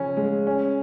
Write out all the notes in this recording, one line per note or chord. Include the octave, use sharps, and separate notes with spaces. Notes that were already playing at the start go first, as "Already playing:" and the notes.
Already playing: C#3 F3 C#4
G#3
C#4